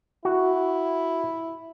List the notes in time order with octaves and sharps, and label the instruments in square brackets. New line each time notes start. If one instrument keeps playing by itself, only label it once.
[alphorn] E4 [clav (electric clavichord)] F#4